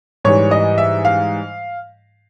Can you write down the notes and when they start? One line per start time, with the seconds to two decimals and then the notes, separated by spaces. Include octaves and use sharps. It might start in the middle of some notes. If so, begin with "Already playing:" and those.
0.25 G#2 E3 G3 C#5
0.51 D#5
0.78 E5
1.05 F5